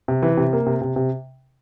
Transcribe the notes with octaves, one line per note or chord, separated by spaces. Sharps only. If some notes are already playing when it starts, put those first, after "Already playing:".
C3
E3
C3
A#3
C3
C3
C3